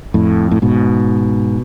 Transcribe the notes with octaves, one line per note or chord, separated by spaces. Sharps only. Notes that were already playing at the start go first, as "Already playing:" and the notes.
F2 A2
A2
G#2 B2